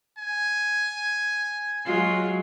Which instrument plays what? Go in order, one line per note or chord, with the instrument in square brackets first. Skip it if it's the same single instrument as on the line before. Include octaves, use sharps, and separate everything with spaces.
[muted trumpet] G#5
[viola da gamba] F#3 G#3 F4